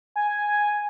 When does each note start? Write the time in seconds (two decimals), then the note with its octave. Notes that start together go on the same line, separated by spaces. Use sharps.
0.16 G#5